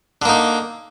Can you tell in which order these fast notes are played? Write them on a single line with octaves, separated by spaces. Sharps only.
D3 A#3 D#4